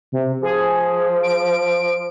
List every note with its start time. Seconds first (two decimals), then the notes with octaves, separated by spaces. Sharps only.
0.12 C3
0.42 F3 G#4
1.23 D7